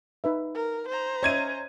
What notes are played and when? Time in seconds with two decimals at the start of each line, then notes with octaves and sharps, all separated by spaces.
0.24 D#4 B4 E5
0.55 A#4
0.88 C5 A#5
1.23 C#4 C#5 D#5 E5 G#6 D#7